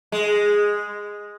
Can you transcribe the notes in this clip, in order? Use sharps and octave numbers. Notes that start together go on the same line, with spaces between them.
G#3